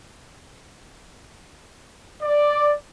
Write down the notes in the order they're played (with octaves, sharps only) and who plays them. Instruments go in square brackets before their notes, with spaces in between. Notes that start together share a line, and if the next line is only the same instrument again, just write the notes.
[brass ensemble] D5